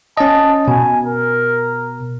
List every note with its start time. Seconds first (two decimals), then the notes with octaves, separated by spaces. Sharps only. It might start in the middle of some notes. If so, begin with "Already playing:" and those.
0.17 C#4 D#5 A5
0.68 B2 G#5
1.05 A#4